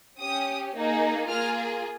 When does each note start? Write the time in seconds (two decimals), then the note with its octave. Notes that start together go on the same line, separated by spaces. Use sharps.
0.21 C#4 G4 D#6
0.76 A#3 D#4 G#4
1.29 A#3 F4 G#4 F6